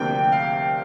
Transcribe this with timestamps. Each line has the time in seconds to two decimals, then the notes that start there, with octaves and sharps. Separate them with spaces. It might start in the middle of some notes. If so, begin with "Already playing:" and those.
Already playing: D2 C3 F3 A#3 D4 G5
0.32 F5